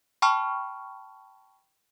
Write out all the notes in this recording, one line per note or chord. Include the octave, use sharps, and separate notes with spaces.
G5 A5 B5 C#6 F6